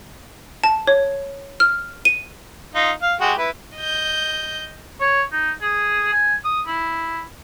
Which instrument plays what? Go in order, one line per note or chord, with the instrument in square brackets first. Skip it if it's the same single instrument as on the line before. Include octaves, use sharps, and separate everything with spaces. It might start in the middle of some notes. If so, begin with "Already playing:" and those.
[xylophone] A5
C#5
F6
D#7
[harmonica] D#4 F4
F5
G#3 F#4 G4
E4 B4
[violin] D#5 G6
[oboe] C#5
D#4
G#4
G#5
D#6
E4